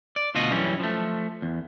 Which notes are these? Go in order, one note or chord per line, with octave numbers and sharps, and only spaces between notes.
D5
D2 B2 F4 F#4 D#5
F#2 E3 G3 C#4
F3 A3
E2